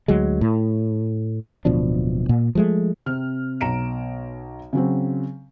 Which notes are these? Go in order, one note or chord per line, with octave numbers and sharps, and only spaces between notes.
D2 F#3 G#3
A2
D1 B2 F3 D4
A#2
F3 G#3 A3
C3 C4 F6
B1 A#5 D7 E7
C#3 F#3 C4